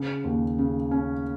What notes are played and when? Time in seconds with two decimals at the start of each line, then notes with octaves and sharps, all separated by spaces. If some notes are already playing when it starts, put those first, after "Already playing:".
Already playing: C#3
0.24 D#2
0.58 C#3
0.91 C#4